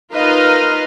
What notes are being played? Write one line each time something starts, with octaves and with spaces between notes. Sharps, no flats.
D#4 F4 A#4 B4 D#5 F5